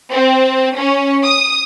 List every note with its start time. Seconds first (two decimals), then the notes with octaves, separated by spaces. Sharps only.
0.12 C4
0.76 C#4
1.22 D#6